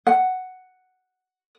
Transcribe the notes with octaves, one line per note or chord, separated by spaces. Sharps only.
F#5